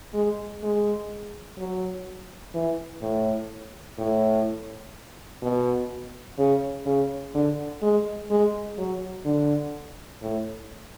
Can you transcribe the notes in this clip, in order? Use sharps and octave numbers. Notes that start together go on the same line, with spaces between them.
G#3
G#3
F#3
E3
A2
A2
B2
C#3
C#3
D3
G#3
G#3
F#3
D3
A2